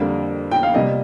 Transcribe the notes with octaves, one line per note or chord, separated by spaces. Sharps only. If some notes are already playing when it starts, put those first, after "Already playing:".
Already playing: F2 D3 G3 A#3 A#4
G5
F5
C3 G3 A#3 D#5